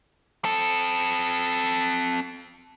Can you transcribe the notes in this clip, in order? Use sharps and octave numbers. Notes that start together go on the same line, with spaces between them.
C4 A4